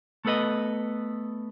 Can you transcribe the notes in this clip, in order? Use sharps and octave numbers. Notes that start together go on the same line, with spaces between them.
A3 B3 A4 B4 D#5